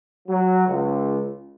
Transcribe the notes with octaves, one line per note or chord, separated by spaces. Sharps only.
F#3
C#2